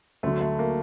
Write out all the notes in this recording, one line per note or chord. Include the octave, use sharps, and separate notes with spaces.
D2 D3 F#3 A3
A3
A#3